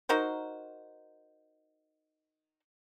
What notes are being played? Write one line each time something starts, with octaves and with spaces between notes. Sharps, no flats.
D#4 F#4 A#4 C5